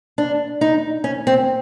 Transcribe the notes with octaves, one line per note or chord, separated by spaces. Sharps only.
D4
D#4
C#4
C4